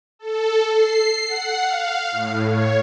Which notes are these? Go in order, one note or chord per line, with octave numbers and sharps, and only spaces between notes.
A4
C7
F#5
F5
A2
C#5